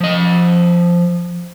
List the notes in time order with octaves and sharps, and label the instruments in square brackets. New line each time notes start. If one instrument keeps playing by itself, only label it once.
[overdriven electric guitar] F3 D#5